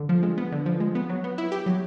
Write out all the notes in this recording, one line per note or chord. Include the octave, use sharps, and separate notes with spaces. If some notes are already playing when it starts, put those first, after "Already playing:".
Already playing: D3
F3
G#3
B3
D3
F3
G#3
B3
F#3
B3
E4
G4
F#3